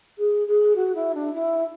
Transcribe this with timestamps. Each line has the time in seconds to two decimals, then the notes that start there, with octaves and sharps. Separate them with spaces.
0.18 G#4
0.47 G#4
0.75 F#4
0.95 E4
1.14 D4
1.33 E4